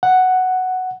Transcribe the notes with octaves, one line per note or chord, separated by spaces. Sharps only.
F#5